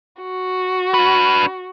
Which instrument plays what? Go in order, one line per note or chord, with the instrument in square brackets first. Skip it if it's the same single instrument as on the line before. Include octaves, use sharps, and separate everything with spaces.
[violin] F#4
[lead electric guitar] D4 B4